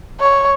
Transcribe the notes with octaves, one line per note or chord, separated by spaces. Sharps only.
C#5